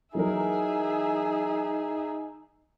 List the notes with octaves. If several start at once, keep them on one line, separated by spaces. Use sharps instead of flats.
E3 F#3 D#4 G#4 A#4 E5